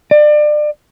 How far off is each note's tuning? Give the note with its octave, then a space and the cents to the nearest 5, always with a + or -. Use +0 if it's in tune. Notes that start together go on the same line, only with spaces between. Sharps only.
D5 +30